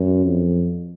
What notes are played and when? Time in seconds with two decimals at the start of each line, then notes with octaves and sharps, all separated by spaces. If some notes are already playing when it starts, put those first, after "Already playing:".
Already playing: F#2
0.25 F2